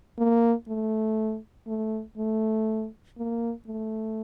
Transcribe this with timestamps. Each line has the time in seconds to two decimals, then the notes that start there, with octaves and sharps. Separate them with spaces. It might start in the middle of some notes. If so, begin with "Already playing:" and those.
0.18 A#3
0.68 A3
1.67 A3
2.18 A3
3.18 A#3
3.67 A3